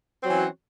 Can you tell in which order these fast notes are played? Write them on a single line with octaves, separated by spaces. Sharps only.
C4 F#3 E3 C#4 F#4